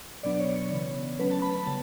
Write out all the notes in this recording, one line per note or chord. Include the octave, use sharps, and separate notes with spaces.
B2 F#3 B3 D4 D5
C#5
C#5
C#3 E3 B3
D3 F#3 A3 C#4 B4
A5
B5
B5
C#3 G3 B3 A5